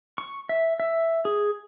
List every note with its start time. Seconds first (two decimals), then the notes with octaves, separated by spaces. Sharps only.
0.18 C#6
0.49 E5
0.80 E5
1.25 G#4